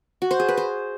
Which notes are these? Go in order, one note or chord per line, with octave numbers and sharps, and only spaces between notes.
F#4
C5
G#4
B4
C5